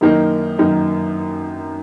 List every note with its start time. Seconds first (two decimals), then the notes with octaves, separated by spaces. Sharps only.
0.01 F#2 D#3 A#3 D#4
0.59 F#2 D#3 A#3 D#4